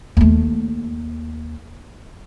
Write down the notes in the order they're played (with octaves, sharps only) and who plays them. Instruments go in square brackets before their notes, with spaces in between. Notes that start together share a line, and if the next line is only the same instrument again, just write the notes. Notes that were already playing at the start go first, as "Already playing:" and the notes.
[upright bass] D#2 A3